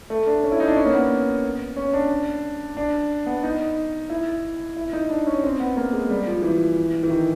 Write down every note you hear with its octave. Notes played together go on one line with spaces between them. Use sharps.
A3
D4
C#4
E4
D#4
D4
C#4
A#3
B3
C#4
D4
D4
B3
D#4
E4
E4
D#4
D4
C#4
C4
B3
A#3
G#3
G3
F3
E3
E3
D#3